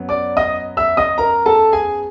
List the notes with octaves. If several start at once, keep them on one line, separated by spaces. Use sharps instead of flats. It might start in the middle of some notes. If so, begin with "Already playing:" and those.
Already playing: F#2 F#3 B3
D5 D6
D#5 D#6
E5 E6
D#5 D#6
A#4 A#5
A4 A5
G#4 G#5